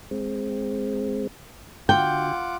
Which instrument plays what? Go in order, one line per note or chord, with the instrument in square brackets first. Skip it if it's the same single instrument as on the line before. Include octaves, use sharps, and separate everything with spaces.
[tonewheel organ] G#3 C4
[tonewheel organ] D3 F#4 [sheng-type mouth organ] F4 F#5 D6 [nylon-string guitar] G5